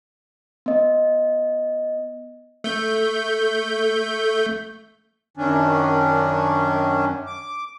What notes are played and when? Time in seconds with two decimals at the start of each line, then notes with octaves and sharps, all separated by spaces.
0.66 B3 D#5
2.64 A3 G6
5.37 F#2 D#3 C#4 D4
7.27 D6